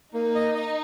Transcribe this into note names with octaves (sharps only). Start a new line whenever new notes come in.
A#3 D#4
D#5
D#5